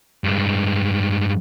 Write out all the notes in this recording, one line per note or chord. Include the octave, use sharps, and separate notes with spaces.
G2 G#3